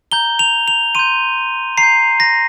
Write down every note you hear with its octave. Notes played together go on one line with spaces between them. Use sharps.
A#5 G6 G7
F7
F7
C6 G6 D#7
A#5 C7
G6
A#6